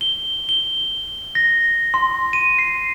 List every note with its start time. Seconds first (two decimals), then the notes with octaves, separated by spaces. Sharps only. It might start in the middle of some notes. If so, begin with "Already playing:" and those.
0.01 G7
0.49 G7
1.35 A#6
1.94 C6
2.33 D#7
2.58 C7